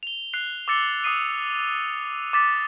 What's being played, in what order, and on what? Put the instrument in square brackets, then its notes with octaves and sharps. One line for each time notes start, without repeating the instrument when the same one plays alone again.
[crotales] F7 G7
F#6 C7 F7
D6 E6 A6 C#7 G7
D6 D#6 C7 D#7
D6 A6 B6